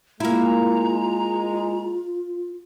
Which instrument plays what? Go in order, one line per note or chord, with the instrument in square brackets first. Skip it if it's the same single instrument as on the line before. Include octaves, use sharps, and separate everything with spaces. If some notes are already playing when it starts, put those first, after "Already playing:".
[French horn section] G#3 [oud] A#3 E4 [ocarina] F4 [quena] A#5